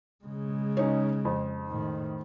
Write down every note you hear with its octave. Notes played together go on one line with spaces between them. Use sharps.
C#3 G#3
C#4 D#4
F2
A2 D#3